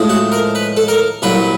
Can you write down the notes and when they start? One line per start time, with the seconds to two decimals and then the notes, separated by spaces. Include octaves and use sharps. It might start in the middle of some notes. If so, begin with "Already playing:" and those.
Already playing: A2 F3 G#3
0.10 F#4
0.32 A#4
0.55 B4
0.77 A4
0.88 A#4
1.22 C2 A#2 F#3 B4